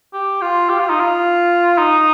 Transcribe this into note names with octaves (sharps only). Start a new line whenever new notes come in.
G4
F4
G4
F4
D#4
F4
D#4